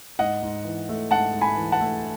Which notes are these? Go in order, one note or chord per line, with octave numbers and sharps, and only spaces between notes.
G#2 D#5 F#5
G#2
E3
A3
G#2 F#5 A5
G#2
G#5 B5
E3
F#5 A5
A3